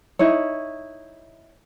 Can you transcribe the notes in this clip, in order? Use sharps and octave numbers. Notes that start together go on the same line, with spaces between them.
D#4 E4 C#5